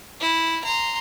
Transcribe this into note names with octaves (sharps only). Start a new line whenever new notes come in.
E4
A#5 C6